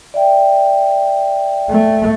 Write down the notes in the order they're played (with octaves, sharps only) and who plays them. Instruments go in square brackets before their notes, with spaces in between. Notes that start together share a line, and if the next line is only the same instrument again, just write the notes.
[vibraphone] D5 E5 G5
[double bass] A3